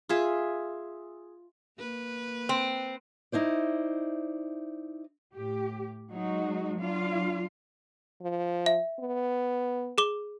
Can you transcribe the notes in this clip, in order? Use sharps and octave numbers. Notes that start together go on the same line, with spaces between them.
F4 G#4 E5
A#3 B4
C4
D#4 E4 C5 D5
A2 G4
F#3 G#3 D#4 F#4
F#3 D4 F4 F5
F3
E5
B3
G#4 D6 G7